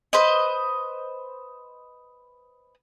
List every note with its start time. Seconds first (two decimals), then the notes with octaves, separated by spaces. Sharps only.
0.13 B4 C5 D#5